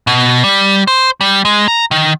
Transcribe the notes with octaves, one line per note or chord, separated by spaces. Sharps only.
B2
G3
C5
G3
G#3
A#5
D#3